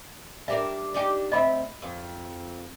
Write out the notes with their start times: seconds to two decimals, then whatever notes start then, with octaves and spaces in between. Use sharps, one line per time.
0.48 G3 D4 A#4 E5
0.94 D4 D#4 G4
1.32 D2 C4 D#5 E5 B5
1.82 F2